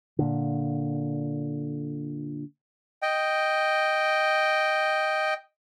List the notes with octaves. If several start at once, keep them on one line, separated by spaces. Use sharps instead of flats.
A#2 D3
D#5 G5